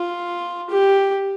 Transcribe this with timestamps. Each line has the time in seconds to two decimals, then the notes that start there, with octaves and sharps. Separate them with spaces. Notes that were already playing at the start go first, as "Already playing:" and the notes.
Already playing: F4
0.70 G4